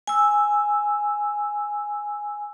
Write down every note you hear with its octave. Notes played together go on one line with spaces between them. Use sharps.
G#5 E6